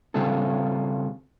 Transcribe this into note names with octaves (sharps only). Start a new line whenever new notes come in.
C#3 G3 C4 F4 G#4 A4